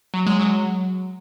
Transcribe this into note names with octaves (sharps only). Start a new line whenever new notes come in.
F#3
G#3
F#3